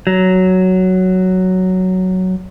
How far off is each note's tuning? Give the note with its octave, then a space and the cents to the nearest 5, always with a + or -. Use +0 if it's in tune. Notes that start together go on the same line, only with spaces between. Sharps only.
F#3 +5